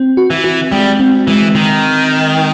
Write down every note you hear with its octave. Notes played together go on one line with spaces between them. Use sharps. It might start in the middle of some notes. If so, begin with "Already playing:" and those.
Already playing: C4
F#4
E3
F#4
G3 G#3
C4
E3 G#3
D#3 D#4